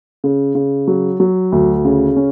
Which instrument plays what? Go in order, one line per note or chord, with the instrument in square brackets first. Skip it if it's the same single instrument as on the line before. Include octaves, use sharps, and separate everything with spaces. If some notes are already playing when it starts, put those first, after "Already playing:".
[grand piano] C#3
C#3
F#3
F#3
D2
C#3
C#4